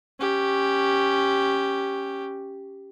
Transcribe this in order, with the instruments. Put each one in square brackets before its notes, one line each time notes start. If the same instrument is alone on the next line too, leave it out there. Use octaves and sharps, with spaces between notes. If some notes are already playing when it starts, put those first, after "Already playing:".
[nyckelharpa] C#4 G4